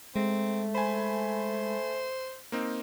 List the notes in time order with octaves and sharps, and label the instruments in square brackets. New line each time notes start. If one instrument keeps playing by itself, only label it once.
[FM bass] G#3 [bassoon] A3 [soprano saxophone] C4
[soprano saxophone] C5 [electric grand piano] G#5 B5
[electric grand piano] A#3 C4 D#4